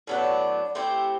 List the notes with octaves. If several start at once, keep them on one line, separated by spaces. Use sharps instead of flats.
A2 F#3 B3 D4
A3 C4 E4 G4